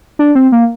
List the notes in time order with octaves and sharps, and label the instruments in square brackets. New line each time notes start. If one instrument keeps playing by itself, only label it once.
[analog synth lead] D4
C4
A#3